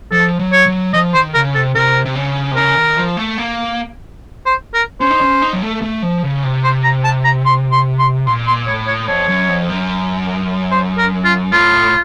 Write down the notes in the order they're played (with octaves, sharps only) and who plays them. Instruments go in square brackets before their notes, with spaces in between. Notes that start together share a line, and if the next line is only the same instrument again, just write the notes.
[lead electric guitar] F3 [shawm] A4
[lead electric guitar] F#3
[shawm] C#5
[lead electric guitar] F#3
[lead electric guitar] F3 [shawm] D#5
[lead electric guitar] D#3 [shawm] C5
[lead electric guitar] C#3 [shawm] A#4
[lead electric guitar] C3 [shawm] A4
[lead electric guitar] C3 [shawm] A#4
[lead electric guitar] C3
C#3
C3
[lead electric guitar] C#3 [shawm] A#4
[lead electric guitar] D#3
F3
A3
A#3
[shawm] C5
A#4
[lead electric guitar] C#4 [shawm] C5
[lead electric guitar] D#4
C#4
D#4
F#3
A3
A3
F3
C#3
C3
[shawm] C5
A#5
A5
A#5
C6
C6
C6
[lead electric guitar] A#2 [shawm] C6
[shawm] C6
[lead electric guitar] A2 [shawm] C#5
[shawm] C#5
[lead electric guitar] F2 [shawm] C#5
[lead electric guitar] F#2
F2
F#2
[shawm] C5
A#4
F4
[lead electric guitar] A2 [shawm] F4